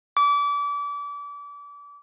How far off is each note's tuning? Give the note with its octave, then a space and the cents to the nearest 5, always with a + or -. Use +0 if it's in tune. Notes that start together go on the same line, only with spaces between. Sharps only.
D6 -30